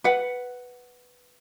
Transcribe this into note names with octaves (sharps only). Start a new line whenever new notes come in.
B4 F#5